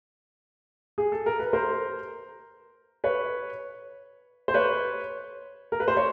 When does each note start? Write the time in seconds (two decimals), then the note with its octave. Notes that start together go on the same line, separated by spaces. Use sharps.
0.98 G#4
1.12 A4
1.26 A#4
1.39 B4
1.53 A#4 C5
3.04 B4 C#5
4.48 C5
4.54 B4 C#5
5.72 A#4
5.80 B4
5.88 C5
5.97 C#5